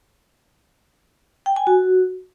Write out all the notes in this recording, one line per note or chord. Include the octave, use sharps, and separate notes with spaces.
G5
G#5
F#4